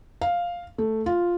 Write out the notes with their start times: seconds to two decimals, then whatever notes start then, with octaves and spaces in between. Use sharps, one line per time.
0.21 F5
0.78 A3
1.06 F4